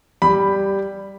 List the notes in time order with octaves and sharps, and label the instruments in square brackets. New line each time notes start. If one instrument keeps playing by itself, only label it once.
[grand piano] G3 B5